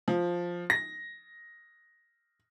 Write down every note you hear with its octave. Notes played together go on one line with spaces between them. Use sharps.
F3
A#6